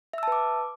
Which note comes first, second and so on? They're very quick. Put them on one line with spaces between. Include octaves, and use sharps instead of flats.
E5 E6 A5 B4 D6